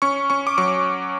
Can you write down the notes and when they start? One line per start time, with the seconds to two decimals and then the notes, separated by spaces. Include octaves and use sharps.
0.02 C#4 C#6
0.30 C#4 C#6
0.47 D6
0.58 F#3 C#6